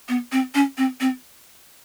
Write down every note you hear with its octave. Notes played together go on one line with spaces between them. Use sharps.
B3
C4
C#4
C4
C4